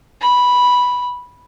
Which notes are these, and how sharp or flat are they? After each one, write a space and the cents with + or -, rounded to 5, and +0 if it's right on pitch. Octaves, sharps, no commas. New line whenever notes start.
B5 -5